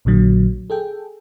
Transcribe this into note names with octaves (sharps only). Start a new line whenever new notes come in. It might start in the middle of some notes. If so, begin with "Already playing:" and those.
A#1 A#2 D3 F#3
G#4 A4 G5